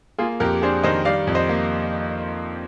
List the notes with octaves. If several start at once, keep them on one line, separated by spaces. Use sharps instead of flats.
A#3 F4 G#4
F2 G4 A#4
D4 G#4 C5
D#3 C5 D#5
G3 D5 F5
F2
C5 D#5
A#3